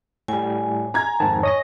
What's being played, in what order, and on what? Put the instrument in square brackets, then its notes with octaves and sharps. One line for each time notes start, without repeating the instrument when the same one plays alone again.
[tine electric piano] A2 G3 [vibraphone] G#5
[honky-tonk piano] A#5 G#6
[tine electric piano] F2 G#2 D#3 [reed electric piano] A5
[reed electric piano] C#5 [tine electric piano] D#5 D#6 A#6